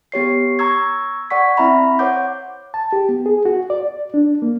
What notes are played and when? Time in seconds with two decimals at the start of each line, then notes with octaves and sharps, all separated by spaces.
0.12 B3 G4 C#5 C7
0.59 A#5 C#6 E6 G#6
1.30 D5 F#5 C#6 B6
1.57 C4 E4 E5 A#5 B5
1.99 C5 C#5 F#5 D6 G6
2.74 A5
2.93 G4
3.09 B3
3.26 G#4
3.45 F#4
3.70 D5
4.14 D4
4.42 A#3